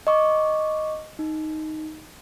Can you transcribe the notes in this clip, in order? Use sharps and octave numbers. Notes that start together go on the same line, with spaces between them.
D#5 C#6 D6
D#4